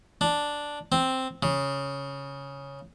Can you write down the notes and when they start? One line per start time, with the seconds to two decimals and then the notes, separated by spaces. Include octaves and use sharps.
0.21 D4
0.92 C4
1.43 C#3